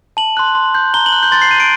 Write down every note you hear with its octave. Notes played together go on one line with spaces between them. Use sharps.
A5 F#7
C6 F#6
C6
G6
A#5 G7
F#7
F#6
G6
C6 A6
C7
G6 D#7
D7